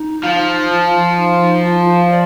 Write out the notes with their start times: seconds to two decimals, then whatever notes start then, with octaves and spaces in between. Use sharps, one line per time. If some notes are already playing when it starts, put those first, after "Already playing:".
Already playing: D#4
0.24 F3
0.71 F4
1.17 D#4
1.42 D#4
1.65 F4
1.88 C5
2.11 D5